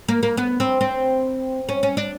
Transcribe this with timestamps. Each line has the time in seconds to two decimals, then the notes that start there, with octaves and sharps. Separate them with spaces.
0.09 A#3
0.23 A#3
0.37 B3
0.60 C4
0.81 C4
1.69 C#4
1.83 C#4
1.97 D4